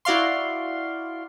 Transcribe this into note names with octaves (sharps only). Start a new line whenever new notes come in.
E4 F#4 D5 F5 C6